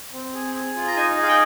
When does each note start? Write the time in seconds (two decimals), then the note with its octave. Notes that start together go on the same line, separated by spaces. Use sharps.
0.13 C4
0.34 G#4
0.55 G#4
0.76 F4
0.87 A#5
0.96 D#4 G#5
1.17 G#4
1.23 F5
1.28 G5